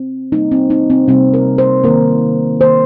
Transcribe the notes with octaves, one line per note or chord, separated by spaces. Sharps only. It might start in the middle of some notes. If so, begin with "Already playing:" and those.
Already playing: C4
C3 G3 A#3 D#4
C4
D#4
C4
C3 G3 A#3 C4
A#4
C5
D#3 A#3 A#4
D#3 A#3 C5